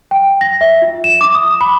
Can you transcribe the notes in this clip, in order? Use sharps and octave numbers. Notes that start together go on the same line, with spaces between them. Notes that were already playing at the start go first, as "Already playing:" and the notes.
G5
A#6
E5
F4
E7
D6
D#6
B5